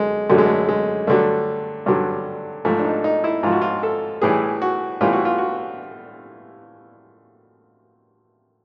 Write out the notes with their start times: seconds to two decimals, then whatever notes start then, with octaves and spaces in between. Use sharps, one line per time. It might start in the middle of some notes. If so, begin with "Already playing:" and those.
Already playing: F#2 D3 G#3
0.30 F#2 D3 F#3 A3
0.38 G#3
0.46 A3
0.68 G#3
1.07 G2 D3 F#3 A3
1.86 G2 D3 F#3
2.65 G#2 F3 A3
2.79 D4
2.84 D#4
3.04 D#4
3.24 E4
3.43 G#2 F3 F4
3.52 F#4
3.61 F4
3.83 A4
4.22 A2 E3 G3 G#4
4.62 F#4
5.01 A2 E3 G3 F4
5.13 F#4
5.25 F4
5.38 F#4